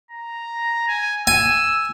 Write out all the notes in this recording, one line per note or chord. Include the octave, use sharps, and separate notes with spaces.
A#5
G#5
G#5 E6